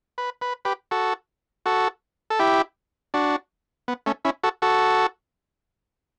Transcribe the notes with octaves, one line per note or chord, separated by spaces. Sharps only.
B4
B4
G4 B4
F#4 A4
F#4 A4
A4
E4 G4
D4 F#4
B3
A3 C#4
C#4 E4
F#4 A4
F#4 A4